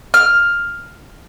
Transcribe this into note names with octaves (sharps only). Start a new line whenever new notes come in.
F6